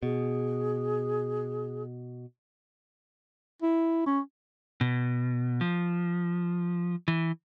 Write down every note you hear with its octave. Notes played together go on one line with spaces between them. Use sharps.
B2 G#4
E4
C#4
B2
F3
E3